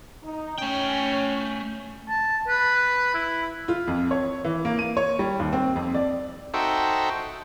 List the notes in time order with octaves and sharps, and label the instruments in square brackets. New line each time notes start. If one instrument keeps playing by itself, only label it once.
[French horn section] D#4
[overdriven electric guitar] A3 G5 [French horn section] C#4
[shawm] A5
B4
E4
[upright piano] F4
F2
C#5
E3
A#3
D#7
C#5
G3
D#2
C4
F2
D5
[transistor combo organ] D#4 F#4 A4 C5 E5 G5